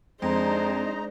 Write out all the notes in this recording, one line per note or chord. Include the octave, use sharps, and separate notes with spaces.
F2 G#3 D4 D#4 C5 A#5